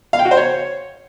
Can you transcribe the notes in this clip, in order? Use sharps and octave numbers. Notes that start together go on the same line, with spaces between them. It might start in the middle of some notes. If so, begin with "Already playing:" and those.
F5
G5
F#4
C5
C#5